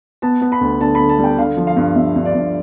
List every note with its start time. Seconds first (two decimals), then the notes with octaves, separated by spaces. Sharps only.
0.22 B3 A5
0.41 B3
0.52 B5
0.61 D2
0.81 D3 A5
0.95 B5
1.00 D3
1.09 A5
1.19 G3
1.24 G5
1.38 D3 F5
1.57 F3
1.67 F5
1.76 G2
1.96 G2 E5
2.16 G2
2.25 D5
2.34 G2